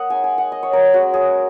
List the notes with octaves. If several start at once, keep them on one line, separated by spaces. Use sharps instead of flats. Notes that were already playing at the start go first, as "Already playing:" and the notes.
Already playing: A#3 D#5 F#5
G#3 D#4 G#5
G#5
F#5
D#5
C#5
A#4
G#3 C#4 F#4
G#4